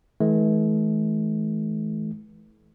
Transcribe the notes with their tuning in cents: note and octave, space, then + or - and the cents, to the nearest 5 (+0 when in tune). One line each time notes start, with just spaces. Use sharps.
E3 -35 A3 -45